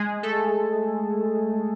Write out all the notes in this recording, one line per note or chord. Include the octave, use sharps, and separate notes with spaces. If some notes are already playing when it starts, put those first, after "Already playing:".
Already playing: G#3 G#4
A3 A4